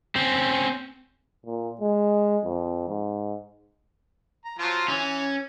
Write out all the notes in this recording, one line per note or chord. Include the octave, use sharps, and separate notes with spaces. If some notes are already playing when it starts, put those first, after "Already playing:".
C4 C#4
A#2
G#3
F2
G#2
A#5
F3 F#3 F4
E3 C#4